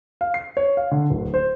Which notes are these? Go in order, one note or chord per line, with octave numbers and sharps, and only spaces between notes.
F5
C7
C#5
F5
D3
D1
C5